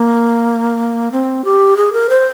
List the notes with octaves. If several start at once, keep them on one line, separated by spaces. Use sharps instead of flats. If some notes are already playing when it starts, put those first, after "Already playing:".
Already playing: A#3
C4
G4
G#4
A#4
C5